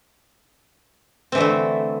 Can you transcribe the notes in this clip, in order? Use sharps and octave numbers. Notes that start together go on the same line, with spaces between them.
D3 E3 A3 C4